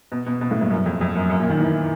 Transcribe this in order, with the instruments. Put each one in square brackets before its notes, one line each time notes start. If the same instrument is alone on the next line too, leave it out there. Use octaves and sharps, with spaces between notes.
[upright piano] B2
B2
B2
A2
G2
F#2
F2
F2
F#2
F#2
A#2
D#3
E3